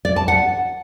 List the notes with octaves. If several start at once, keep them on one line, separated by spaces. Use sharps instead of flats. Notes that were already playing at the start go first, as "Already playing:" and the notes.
D5
A5
F#5